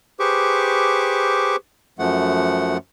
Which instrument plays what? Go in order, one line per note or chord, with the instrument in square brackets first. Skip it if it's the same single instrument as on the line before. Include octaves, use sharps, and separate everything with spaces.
[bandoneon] G4 G#4 B4 C5 C#6 D6
F#2 F3 A3 F#5